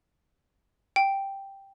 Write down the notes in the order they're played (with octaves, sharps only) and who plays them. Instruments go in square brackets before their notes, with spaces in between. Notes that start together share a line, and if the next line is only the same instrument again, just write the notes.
[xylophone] G5